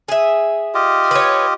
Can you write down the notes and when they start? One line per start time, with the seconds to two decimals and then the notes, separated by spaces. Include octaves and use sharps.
0.08 G#4 E5
0.75 F4 G4 D#5
1.11 B4 C#5